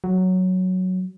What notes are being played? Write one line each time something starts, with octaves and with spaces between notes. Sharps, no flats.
F#3